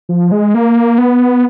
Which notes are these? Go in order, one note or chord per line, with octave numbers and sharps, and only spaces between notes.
F3
G#3
A#3
B3